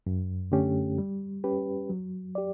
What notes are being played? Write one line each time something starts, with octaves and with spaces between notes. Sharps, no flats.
F#2
D3 A3 C#4 G4
G3
C#4 G4 B4
F#3
G4 D5